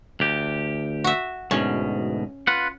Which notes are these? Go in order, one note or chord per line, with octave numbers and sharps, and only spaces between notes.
D2 G4
F#4 E5
D2 G#2 B2 C#4
F4 B4 F#5